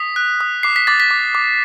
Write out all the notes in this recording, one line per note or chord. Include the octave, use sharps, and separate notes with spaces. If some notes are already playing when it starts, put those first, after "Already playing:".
Already playing: D#6 B6
F#6
D#6
D6 C7
B6
D6 A6
B6
D6
D6